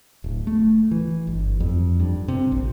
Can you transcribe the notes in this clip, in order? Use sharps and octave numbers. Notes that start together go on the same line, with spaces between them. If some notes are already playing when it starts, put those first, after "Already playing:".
D1
A3
E3
G1
F2
G2
C3
A#1